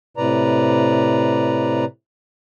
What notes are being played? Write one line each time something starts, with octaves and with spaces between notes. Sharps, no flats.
A2 C3 B4 D5 A#5